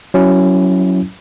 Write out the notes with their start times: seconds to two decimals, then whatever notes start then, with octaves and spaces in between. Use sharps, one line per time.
0.14 F#3 C#4 E4